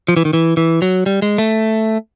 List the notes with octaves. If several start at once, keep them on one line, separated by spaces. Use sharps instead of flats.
F3
E3
D#3
E3
E3
F#3
G3
G#3
A3